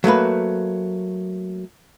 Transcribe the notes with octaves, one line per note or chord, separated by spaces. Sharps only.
F#3 A3 A#3 B4